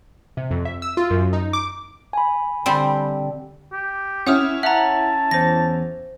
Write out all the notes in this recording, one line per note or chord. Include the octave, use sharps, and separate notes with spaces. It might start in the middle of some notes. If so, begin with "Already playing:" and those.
C3
F2
E5
E6
F4
F#2
D#4
D6
G#5 B5
D3 G3 C4
G4
C#4 E4 F#5 D#6 F6
E5 F#5 A5 A#5
E2 C5 A#6